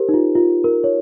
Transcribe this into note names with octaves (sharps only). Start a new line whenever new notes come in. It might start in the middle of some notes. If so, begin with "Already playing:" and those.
Already playing: G4 A#4 C5
D#4
F4
F4
A#4
C#5